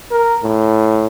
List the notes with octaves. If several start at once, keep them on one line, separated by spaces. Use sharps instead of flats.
A#4
A2